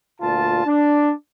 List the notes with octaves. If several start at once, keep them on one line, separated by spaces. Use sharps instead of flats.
D2 A#2 F4 A5
D4